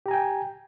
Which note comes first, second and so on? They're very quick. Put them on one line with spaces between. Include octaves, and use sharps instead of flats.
G4 A#5 G#5 G5